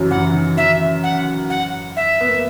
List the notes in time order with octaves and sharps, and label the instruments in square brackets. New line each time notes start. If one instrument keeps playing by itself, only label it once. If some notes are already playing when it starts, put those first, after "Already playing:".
Already playing: [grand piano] F#2 E3 F#3
[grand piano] E3 [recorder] F#5
[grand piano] D#3
[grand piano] E3 [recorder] E5
[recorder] F#5
F#5
E5
[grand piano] B3
A#3